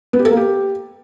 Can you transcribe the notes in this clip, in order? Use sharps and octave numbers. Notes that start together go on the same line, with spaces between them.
B3
G4
A4
A#3
G4